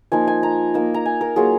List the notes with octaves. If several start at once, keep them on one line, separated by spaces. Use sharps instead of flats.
F3 A#3 D#4 G#5
G#5
A#5
A#3 D#4
A#5
G#5
A#4
F#3 A#3 F4 G#4